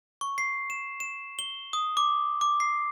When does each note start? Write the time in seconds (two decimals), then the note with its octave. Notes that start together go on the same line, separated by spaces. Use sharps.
0.21 C#6
0.38 C7
0.70 E7
1.00 E7
1.39 G7
1.73 D#6
1.97 D6
2.41 D6
2.60 C7